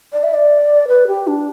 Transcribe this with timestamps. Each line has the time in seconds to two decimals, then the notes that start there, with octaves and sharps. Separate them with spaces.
0.13 D5
0.23 E5
0.34 D5
0.88 B4
1.07 G4
1.27 D4